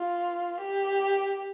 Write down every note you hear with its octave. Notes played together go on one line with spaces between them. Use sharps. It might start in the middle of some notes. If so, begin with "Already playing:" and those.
Already playing: F4
G4